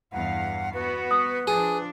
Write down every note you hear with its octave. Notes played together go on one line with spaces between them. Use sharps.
E2 G2 F5 F#5
B3 F#4 B4
D#6
F3 D4 G#4